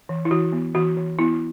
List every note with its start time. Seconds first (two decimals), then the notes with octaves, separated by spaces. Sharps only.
0.09 E3
0.25 E4
0.31 E3 F#4
0.52 B3
0.75 E3 F#4
0.97 E3
1.19 B3 E4